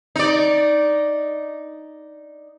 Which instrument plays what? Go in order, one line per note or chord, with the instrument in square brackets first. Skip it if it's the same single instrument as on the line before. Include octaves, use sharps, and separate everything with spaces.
[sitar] D#4 D5